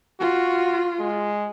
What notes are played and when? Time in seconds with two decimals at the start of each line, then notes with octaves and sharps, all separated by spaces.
0.20 F4 F#4
0.99 G#3